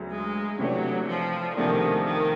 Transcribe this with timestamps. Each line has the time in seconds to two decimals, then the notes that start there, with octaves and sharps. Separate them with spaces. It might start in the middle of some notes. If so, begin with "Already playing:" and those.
Already playing: D2 C#3 F#3 B3
0.11 G#3
0.59 C3 E3 F#3 A3 D4
1.07 F3
1.57 E2 C3 D#3 F3 A3 D4
2.05 D#3